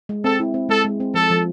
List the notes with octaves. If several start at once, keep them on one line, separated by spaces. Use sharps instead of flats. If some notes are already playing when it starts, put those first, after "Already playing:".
G#3
C4 A4
E4
C4
G#3 A4
G#3
C4
F3 A4
F3